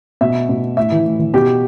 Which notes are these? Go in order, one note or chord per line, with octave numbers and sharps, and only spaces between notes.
B2 E5
B2
A2 E5
E3
A2
E3
B2 G4